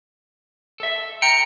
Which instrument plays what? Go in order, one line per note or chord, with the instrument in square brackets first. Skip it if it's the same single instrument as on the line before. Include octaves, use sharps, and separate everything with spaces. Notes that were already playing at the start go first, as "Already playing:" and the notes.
[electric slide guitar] A4 E5
[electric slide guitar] G5 A#5 [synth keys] C#7